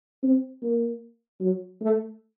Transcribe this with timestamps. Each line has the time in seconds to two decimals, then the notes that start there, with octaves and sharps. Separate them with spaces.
0.23 C4
0.62 A#3
1.40 F#3
1.81 A3